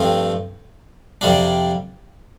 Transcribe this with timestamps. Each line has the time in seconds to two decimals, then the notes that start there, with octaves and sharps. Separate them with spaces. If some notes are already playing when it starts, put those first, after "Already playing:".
Already playing: G2 F3 A3 C4
1.21 F2 C3 G3 D4